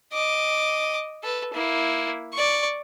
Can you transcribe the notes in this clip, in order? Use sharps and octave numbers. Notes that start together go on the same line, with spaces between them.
D#5 D6
A4 B4
A#3 E4
D5 C#6